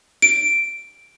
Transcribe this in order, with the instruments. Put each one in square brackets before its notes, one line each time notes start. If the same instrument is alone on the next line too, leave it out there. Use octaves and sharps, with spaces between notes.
[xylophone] D7